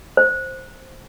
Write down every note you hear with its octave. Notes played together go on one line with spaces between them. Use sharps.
C5